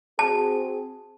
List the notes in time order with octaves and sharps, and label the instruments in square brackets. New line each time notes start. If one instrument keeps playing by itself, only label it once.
[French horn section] C4 F#4 G#4 [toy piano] A5